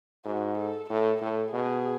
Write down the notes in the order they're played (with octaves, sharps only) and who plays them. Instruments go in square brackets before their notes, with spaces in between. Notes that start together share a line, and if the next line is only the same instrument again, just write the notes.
[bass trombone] G#2 [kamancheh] F#4
[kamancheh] A4
[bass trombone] A2 [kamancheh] A4
[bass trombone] A2 [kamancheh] A4
[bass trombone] B2 [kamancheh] G#4